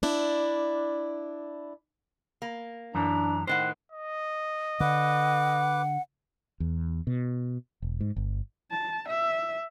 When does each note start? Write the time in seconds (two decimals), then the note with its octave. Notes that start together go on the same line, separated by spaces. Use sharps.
0.03 D4 E4
2.42 A#3
2.94 F#2 E3 D4 A#5
3.47 A2 D#3 C5 F#5 F#6
3.92 D#5
4.80 D3 B4 F#5 D6
6.60 E2
7.07 B2
7.82 E1
8.01 G#2
8.16 G1
8.71 A5
9.09 E5